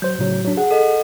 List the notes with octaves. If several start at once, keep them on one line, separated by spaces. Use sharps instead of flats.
F#3 C5 G6
A2 C#3 F#3
F#3 D4
G#4 F#5
A4 D#5